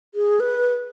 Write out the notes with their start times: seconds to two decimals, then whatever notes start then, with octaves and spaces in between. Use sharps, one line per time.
0.14 G#4
0.40 B4